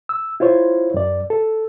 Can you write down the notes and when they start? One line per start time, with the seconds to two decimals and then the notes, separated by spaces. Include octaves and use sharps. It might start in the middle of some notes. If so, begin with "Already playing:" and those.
0.09 E6
0.40 E4 F4 C5 C#5
0.94 F#2 D5
1.30 A4